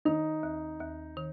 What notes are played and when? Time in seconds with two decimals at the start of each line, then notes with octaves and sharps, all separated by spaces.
0.05 D#3 D#4
0.43 D#2
0.80 D#2
1.17 D#3